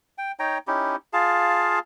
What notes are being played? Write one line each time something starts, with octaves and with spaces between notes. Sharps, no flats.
G5
D#4 C#5 G5 A#5
C#4 D#4 E4 G4
F4 G#4 F5 A5